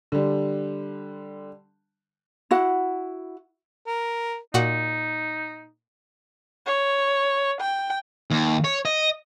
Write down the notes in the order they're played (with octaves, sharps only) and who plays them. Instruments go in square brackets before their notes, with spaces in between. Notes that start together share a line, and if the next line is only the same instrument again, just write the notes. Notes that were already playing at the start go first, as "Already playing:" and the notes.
[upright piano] D3 G3
[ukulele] E4 F#4 F#5
[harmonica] A#4
[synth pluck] A#2 F#4 [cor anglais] D#4
[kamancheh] C#5
G5
[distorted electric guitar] D#2
C#5
D#5